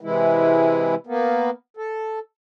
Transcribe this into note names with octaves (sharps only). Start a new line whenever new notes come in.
C3 E3 G#3 E4
A#3 B3
A4